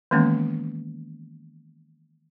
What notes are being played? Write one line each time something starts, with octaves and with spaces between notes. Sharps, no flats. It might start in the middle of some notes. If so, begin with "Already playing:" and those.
D#3 E3 G#3 A#3 B3 C#4